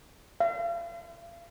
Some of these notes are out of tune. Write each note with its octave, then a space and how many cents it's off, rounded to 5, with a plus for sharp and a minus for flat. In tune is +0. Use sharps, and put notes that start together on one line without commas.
F5 -40